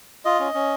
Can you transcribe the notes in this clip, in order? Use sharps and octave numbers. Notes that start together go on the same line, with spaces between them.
F4 D#5
C#4
C#4